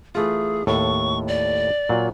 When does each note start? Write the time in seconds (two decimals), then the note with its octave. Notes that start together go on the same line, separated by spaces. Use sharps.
0.15 E3 A3 F4 G#4
0.67 D#2 A2 A4 C#6
1.28 D5
1.89 A#2 F#3